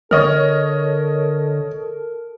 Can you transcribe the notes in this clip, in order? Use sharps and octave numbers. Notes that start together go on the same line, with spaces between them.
D3 A4 A#4 C#5 D#5 F6